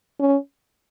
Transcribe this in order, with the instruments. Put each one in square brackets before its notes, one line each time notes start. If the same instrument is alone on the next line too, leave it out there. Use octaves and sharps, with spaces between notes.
[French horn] C#4